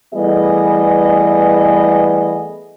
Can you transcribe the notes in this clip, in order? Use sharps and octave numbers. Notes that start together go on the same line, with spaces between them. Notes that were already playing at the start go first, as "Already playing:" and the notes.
E3 G3 A3 B3 G#4 D#5